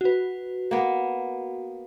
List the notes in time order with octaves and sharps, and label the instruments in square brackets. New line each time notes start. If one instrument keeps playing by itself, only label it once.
[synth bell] F#4 B4
[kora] A#3 B3